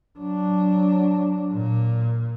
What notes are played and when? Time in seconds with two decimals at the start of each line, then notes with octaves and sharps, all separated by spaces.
0.19 F#3 D4
1.52 A#2